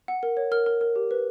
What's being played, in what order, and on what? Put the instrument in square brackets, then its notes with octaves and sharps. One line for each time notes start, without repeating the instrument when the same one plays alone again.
[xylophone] F#5
A#4
C#5
A#4 F6
A#4
A#4
G4
B4